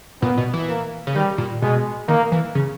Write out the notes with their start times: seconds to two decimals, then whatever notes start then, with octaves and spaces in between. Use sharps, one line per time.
0.22 A#2 B3
0.38 B2
0.53 E3
0.69 A#3
1.07 C#3
1.15 D#3 G3
1.38 A#2
1.62 B2 G#3
2.08 D#3 A#3
2.32 E3
2.55 C#3